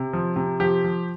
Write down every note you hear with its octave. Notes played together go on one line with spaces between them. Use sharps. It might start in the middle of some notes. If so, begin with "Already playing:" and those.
Already playing: C3
F3
C3
F3 G4
F3